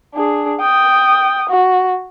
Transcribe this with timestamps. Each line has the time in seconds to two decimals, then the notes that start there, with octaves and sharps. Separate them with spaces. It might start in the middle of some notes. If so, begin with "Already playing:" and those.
0.14 D4 G#4
0.61 G5 D#6
1.49 F#4